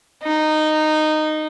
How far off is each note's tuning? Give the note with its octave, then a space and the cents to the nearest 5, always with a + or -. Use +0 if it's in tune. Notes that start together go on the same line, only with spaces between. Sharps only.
D#4 -15